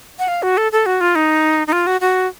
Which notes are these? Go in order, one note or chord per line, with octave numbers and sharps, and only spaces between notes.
F#5
F5
F#4
A4
A4
F#4
F4
D#4
D#4
F4
F#4
F#4